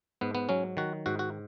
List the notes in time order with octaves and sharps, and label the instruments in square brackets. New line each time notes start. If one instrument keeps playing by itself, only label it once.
[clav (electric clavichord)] G#2 B3
B3
F#3 C#4
D#3 F#4
G#2 F#4
F#4